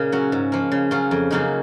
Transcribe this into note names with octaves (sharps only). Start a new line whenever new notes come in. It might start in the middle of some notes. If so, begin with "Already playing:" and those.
Already playing: A#2 C#3 A#3 D#4
F#3 C#4 F#4
G#2
F3 A#3
C#3
F#3 C#4 F4
F2
C#3 F#3 A#3 D#4